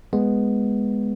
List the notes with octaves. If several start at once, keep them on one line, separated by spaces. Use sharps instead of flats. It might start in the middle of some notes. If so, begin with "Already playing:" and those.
G#3 B3